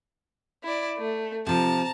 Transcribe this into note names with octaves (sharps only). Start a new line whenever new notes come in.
E4 D5
A3
C3 F3 A5 A#5